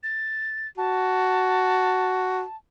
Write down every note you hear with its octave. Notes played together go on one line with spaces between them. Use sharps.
A6
F#4 A5